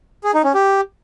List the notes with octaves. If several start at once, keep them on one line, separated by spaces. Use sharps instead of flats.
G#4
D#4
C#4
G4